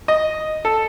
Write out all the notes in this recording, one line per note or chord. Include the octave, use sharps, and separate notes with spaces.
D#5
A4